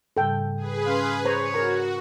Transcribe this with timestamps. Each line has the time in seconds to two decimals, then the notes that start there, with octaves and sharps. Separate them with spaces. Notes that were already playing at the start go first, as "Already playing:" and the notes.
0.17 G#2 C#3 G3 A4 G5
0.57 G#4 B4
0.87 C#4 F5 C6
1.25 C5 C#5 A#5
1.54 F#4 A#4 A#5